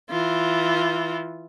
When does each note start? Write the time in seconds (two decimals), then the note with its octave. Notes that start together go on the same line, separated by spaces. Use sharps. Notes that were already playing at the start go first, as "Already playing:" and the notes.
0.10 E3 F4